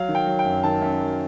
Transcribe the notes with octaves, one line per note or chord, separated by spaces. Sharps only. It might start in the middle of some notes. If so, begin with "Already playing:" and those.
Already playing: F#3 F5
D#3
G5
F#3
G5
F#2
D#3 A5
F#2
F#3